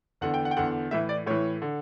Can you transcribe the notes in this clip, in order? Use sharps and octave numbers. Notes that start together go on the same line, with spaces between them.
E2 D3 F#5
G5
F#5
G5
E2 D3 F#5
A2 E3 E5
D5
A2 E3 C#5
D3